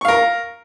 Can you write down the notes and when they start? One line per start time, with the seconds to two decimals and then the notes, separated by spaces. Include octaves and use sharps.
0.01 C#6
0.05 F5
0.08 A#4